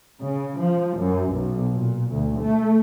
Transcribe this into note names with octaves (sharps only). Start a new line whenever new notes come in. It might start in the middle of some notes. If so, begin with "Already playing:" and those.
C#3
F3
F#2
B1
A#2
D2
A3